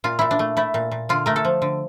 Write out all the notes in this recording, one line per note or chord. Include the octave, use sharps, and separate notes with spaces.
A#2 F4
A#2 E4
D4
A3
A3 E4
A#2
A#2
D3 F4
A3 A#4
A4
F3
D3